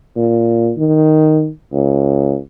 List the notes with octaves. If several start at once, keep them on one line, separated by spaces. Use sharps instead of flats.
A#2
D#3
C#2